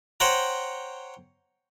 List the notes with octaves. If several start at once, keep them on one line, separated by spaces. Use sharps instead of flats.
C5 C#5 F#5 G5 A#5